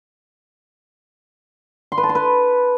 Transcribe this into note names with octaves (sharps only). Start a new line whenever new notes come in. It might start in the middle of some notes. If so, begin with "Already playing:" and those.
C6
B4
A5
C6
B4